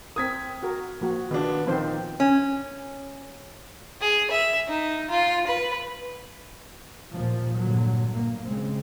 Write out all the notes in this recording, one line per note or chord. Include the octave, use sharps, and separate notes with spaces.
C4 A#4 D#6 G#6 B6
F#4 A#4
F3 A#3 F#4
B2 D#3 B3 D4 F4
A#2 D#3 F3 C4 C5
C#4
G#4
E5
D#4
F4
B4
D#2 A#2 F3
G2 A#2 D3 F#3
A#2 A#3
C#3 G#3 C4